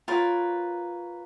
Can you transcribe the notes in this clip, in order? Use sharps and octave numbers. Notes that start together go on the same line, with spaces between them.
F4 A#4 B4 C#5